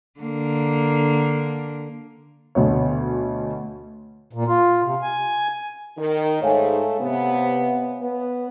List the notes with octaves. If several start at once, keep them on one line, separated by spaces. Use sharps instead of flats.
D3 A#3
D2 B2 C#5
A#2
F4
C3
G#5
D#3
G#2 A3 C#5 F5 G#5
C3 B3
B3